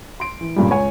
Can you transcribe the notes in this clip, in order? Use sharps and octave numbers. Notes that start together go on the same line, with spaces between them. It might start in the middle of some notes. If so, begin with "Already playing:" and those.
C6 D7
E3
G2 A#2 C#3 G3
C#2 C#5 G#5